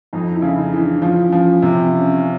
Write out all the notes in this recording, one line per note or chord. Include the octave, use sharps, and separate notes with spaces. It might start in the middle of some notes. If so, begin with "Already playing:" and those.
F2 D#4
E4
C#3
D#4
E3
D4
F3 C#4
F3
C3